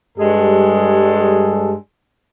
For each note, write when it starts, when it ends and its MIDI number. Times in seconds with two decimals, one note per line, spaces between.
0.18 1.73 43
0.18 1.73 55
0.18 1.73 56
0.18 1.73 68
0.18 1.73 69